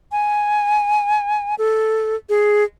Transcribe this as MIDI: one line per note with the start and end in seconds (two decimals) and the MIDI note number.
0.12 1.55 80
1.58 2.16 69
2.29 2.64 68